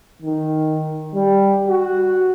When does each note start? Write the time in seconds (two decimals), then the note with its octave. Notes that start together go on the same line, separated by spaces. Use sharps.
0.22 D#3
1.15 G3
1.68 F#4